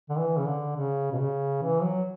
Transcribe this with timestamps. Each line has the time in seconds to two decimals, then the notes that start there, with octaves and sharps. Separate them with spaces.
0.10 D3
0.18 E3
0.37 C#3
0.47 D3
0.76 C#3
1.12 B2
1.19 C#3
1.62 E3
1.83 F#3